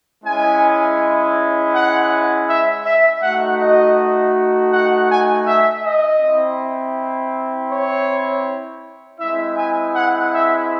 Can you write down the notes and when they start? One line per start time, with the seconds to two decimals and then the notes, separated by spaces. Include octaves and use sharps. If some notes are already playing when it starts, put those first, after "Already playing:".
0.24 G#3 C#4 E4 G#5
1.73 F#5
2.47 E5
2.85 E5
3.22 A3 D#4 F#4 F#5
3.60 D#5
4.72 F#5
5.09 G#5
5.46 E5
5.83 D#5
6.21 C4 E4
7.70 C#5
9.19 G#3 C4 E4 E5
9.56 G#5
9.94 F#5
10.32 E5